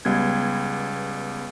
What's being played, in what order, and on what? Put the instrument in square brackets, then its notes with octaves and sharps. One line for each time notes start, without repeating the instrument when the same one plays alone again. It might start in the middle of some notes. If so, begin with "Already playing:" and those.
[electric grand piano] C#2 G3 B3 G#6